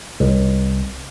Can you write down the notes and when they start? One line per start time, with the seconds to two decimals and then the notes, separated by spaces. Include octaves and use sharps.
0.20 C2